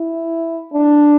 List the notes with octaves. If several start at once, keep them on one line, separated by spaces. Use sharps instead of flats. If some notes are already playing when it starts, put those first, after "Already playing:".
Already playing: E4
D4